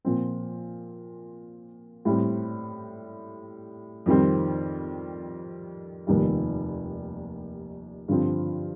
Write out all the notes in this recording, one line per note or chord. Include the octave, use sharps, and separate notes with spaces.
A#2 F3 C4
A2 G3 C4
F2 D#3 G3 C4
F1 D#2 D#3 G3
G2 D3 F3 C4